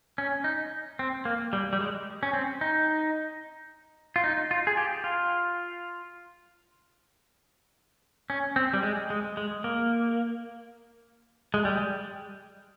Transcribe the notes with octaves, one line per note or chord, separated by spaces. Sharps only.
C#4
D#4
C4
A#3
G3
G3
G#3
C#4
C4
D#4
F4
D#4
F4
G#4
G4
F4
C#4
C4
G3
G#3
G#3
G#3
A#3
G#3
G3
G#3